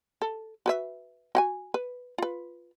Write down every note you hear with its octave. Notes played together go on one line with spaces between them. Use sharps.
A4
F#4 B4 E5
F#4 F#5 G#5
B4
F4 B4